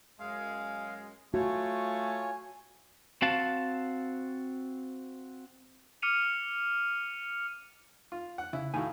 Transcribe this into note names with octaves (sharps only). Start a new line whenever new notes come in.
F#2 G#3 F5
A3 F4 F#4 C#5 G#5
C4 F#4 F5 A5
D6 F6 C#7 D#7 F7
F4
F#5
C#3 E4
A2 D#3 F#4 F5 G#5